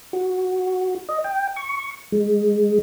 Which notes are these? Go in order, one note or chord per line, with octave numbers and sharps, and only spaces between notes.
F#4
D#5
G5
C#6
G#3